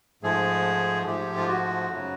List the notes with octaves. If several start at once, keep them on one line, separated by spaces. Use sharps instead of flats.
G#2 F3 A3 G#4
G#2 F3 A3 G4
F4
F#4
F#2 C#3 F#3